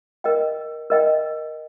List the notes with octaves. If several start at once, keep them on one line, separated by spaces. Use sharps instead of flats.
A#4 D#5 G5
A#4 D#5 G5